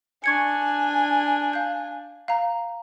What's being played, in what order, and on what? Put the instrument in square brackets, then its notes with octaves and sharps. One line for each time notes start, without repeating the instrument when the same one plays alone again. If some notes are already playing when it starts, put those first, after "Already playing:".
[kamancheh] D4 G#5 [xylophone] C#6 G#6 C#7
[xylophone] F5 G6
F5 A#5